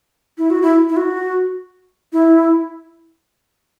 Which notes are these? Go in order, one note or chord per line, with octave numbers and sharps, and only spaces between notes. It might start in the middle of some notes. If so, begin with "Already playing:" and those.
E4
F#4
E4
E4
F#4
E4